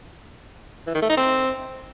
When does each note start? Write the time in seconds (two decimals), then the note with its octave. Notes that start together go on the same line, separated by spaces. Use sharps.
0.87 E3
0.94 D#3
1.02 A3
1.09 D#4
1.17 C4